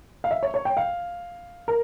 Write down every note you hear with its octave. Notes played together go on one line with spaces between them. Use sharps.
F5
E5
C#5
C#5
G5
F5
A#4